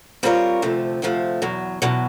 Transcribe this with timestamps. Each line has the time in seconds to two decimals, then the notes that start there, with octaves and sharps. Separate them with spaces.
0.23 G3 C4 F4 A#4 C#5
0.62 D2 C3 F3 A3
1.02 D2 C3 F3 A3
1.42 E2 B2 F#3
1.82 E2 B2 F#3